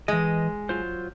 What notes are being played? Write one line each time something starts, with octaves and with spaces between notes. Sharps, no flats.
E3 G#3 D#5
F#3 F4 C5